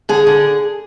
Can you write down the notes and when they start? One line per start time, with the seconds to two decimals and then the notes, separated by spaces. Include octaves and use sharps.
0.09 D3 G#4
0.27 D3